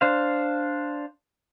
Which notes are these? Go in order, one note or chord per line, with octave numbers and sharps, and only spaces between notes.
D4 C5 F5